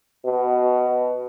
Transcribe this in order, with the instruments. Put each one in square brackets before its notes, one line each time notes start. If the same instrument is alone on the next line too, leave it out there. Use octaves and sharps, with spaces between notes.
[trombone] B2